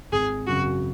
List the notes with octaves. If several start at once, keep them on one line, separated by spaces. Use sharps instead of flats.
G#1 G#4
F#2 C#3 F#3 F#4